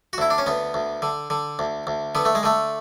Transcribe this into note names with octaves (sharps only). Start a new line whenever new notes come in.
F#4
D2 E4
D4
C#4
D2 B3
D2
D3
D3
D2
D2
D3 B3
A3
G#3
D3 A3